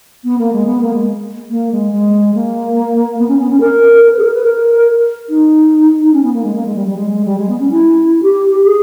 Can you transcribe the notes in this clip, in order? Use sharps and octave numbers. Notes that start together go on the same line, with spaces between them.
B3
A#3
G#3
B3
A#3
G#3
A#3
G#3
G#3
A#3
B3
C#4
B3
C#4
A#4
A#4
B4
G#4
A#4
B4
A#4
D#4
C#4
B3
A#3
G#3
A#3
G#3
G3
G3
G#3
G#3
G3
G#3
B3
C#4
E4
G4
G#4